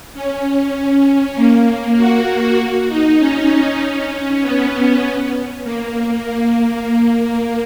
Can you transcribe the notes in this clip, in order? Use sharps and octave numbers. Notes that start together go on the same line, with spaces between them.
C#4
A#3
F#4
D#4
C#4
C#4
B3
A#3
A#3